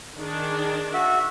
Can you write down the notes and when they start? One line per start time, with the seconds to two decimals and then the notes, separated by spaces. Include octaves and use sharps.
0.17 D#3 D4 G#4
0.93 F#4 E5